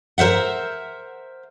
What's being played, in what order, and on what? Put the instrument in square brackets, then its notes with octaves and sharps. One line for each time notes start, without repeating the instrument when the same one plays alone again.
[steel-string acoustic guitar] A#4 C5 E5 F#5